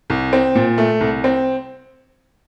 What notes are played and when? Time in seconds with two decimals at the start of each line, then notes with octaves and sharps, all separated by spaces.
0.10 C2
0.33 C4
0.55 A#2
0.78 A3
1.01 C2
1.24 C4